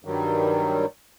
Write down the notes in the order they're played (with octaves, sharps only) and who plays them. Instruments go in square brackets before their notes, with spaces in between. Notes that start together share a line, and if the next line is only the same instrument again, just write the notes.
[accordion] G2 D#3 F#3 G3